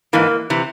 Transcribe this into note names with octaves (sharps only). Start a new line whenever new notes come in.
G#2 E3 A#3
C3 E3